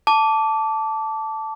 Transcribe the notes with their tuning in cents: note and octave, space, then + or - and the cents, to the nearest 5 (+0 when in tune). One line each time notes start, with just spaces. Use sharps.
A5 +0 D6 -20